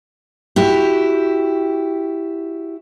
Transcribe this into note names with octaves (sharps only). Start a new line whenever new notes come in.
E4 F#4 G4